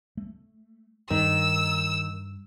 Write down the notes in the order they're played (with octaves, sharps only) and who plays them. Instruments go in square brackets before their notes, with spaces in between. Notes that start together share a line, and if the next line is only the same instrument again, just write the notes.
[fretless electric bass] A3
[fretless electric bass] G2 [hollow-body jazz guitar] D#3 [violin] E6